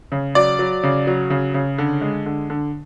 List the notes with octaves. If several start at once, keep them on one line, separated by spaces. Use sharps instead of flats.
C#3
F#3 D5
F#3
C#3
F#3
C#3
C#3
D3
G#3
D3
D3